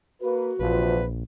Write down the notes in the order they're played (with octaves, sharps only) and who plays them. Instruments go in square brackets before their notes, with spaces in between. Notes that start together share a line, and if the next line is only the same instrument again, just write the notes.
[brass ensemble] A#3 B4 [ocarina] F#4
[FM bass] A#1 [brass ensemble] E2 C3 F3 [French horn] B4